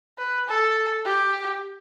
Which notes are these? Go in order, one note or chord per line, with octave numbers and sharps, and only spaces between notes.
B4
A4
G4